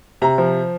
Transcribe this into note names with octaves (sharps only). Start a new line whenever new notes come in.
C3 A#5
F3